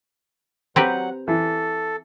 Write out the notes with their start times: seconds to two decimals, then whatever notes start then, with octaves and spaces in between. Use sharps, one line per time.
0.76 F#3 C4 G4 B4 F#5 A#5
1.28 E3 A4